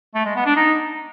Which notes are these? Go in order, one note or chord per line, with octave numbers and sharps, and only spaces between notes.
A3
G#3
B3
D4
D#4